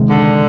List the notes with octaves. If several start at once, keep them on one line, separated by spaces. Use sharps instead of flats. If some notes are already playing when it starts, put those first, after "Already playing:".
Already playing: C3 D#3 G#3
D3